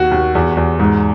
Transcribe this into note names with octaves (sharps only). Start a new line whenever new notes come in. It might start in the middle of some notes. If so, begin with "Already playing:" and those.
Already playing: D#2 F#4
D#2
E2
E2
G#2